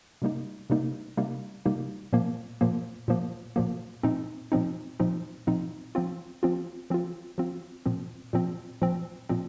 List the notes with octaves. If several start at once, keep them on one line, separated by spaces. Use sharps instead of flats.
C3 G3 A#3 D#4
C3 G3 A#3 D#4
C3 G3 A#3 D#4
C3 G3 A#3 D#4
A#2 F3 A#3
A#2 F3 A#3
A#2 F3 A#3
A#2 F3 A#3
A#2 F3 C4 D#4
A#2 F3 C4 D#4
A#2 F3 C4 D#4
A#2 F3 C4 D#4
F3 C4 F4
F3 C4 F4
F3 C4 F4
F3 C4 F4
A#2 F3 C4
A#2 F3 C4
A#2 F3 C4
A#2 F3 C4